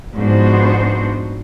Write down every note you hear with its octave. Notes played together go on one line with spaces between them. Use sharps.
G#2 F3 B3 D4 F#4 C5